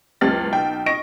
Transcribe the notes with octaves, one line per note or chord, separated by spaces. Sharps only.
F#1 C#2 G4 F6 A6
B1 G5
D#5 C#6 A#6 D7